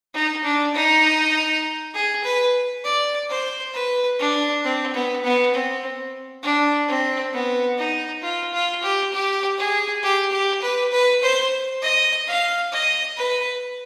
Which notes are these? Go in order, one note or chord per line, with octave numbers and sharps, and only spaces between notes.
D#4
D4
D#4
G#4
B4
D5
C5
B4
D4
C4
B3
B3
C4
D4
C4
B3
D#4
F4
F4
G4
G4
G#4
G4
G4
B4
B4
C5
D#5
F5
D#5
B4